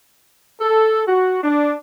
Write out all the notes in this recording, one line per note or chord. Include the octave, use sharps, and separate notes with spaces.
A4
F#4
D4